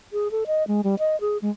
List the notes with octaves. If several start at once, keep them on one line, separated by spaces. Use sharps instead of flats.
G#4
A4
D#5
G#3
G3
D#5
G#4
G#3